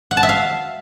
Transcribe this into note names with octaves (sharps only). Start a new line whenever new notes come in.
F#5
A5
E5
F5